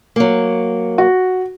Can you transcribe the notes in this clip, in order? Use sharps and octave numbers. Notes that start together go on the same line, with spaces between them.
F#3 A#3
F#4